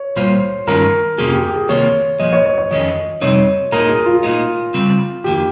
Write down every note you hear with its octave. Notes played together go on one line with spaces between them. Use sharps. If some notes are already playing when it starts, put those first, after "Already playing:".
Already playing: C#5
A#2 G3 A#3 F4 C5
G2 D#3 G#3 C#4 F4 A#4
F2 C3 F3 A#3 C#4 G#4
G4
G4
G#4
C3 D#3 A#3 F4 C#5
A#2 F3 G#3 D#5
C#5
C#5
C#5
F2 D#3 G#3 C#4 D#5
F2 C3 G3 C4 D#4 C#5
A#2 G#3 D#4 A#4
G#4
F4
A#2 G#3 D#4
C#3 G3 C4
F2 D#3 A#3 G4